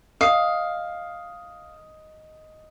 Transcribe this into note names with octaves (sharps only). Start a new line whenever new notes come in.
D#5 F5 D#6 C7